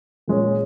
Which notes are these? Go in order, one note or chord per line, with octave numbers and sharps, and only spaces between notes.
A#2 G#3 C#4